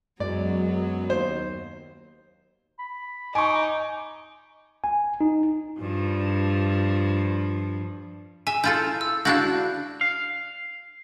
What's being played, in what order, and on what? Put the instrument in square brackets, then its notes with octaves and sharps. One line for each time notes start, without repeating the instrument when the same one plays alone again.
[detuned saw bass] F#2 [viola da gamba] F#3 B3 [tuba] G#3 [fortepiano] D5
[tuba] D#2 [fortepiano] C5
[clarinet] B5
[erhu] D#4 [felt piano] G#5 C#6 [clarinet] D6
[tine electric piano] G#5
D#4
[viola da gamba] G2 F3
[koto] E5 [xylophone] G#5
[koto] E4 F4 A4 [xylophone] G6
[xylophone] E6
[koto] D4 E4 F#4 [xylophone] F5 F#6 G6
[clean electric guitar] F5